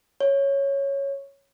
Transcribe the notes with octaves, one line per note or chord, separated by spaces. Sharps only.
C#5